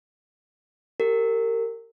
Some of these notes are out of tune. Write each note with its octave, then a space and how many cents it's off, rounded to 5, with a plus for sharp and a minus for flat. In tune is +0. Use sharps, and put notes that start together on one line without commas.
G4 +0 A#4 -30